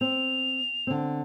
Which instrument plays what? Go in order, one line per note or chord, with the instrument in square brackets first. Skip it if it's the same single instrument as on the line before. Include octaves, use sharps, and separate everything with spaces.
[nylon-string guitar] C4 [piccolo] F7
[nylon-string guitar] D3 C4